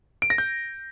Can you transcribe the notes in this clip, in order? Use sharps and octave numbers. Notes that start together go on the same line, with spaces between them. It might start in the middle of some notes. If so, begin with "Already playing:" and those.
D7
A#6
G6